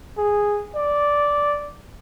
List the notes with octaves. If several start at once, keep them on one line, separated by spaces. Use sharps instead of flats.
G#4
D5